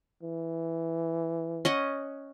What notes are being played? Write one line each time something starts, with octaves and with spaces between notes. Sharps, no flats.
E3
C#4 D#5 F#5